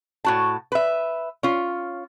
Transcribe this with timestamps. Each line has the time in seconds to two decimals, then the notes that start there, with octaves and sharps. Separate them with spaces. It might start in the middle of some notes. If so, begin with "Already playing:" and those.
0.24 A2 F#4 A5
0.72 B4 E5
1.43 C#4 F4